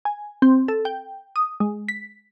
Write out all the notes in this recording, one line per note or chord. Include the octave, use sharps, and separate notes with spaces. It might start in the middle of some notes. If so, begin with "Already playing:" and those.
G#5
C4
A4
G5
D#6
G#3
B6